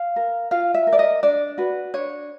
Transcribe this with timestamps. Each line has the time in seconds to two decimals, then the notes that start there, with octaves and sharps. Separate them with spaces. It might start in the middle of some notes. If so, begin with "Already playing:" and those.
Already playing: F5
0.16 A#4
0.51 F4 F5
0.74 E5
0.87 A#4
0.92 D5
0.99 D#5
1.23 D4 D5
1.58 F#4 B4
1.94 D4 C#5